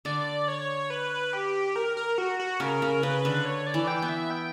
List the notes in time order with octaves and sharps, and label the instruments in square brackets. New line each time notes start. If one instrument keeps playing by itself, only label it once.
[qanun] D3 [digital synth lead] D5
[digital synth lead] C#5
B4
G4
A#4
A#4
F#4
F#4
[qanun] C#3 [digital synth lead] A#4
[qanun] C#3
[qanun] C#3 [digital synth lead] B4
[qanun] D3
[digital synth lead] C#5
D5
[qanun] E3
[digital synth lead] G5
[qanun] B3
[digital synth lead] E5
G5